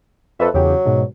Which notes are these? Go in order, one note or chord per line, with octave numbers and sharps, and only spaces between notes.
F2 A4 B4 E5
E2 C#3 F#3 G4
G#2 B2